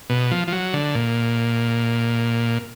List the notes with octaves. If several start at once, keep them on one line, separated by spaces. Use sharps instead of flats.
B2
F3
F3
F#3
D3
A#2